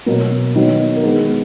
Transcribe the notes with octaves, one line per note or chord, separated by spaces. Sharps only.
B2 F#3 A#3 A#4
D#3 F#3 B3
A#4
D#3 G#3 B3 G#4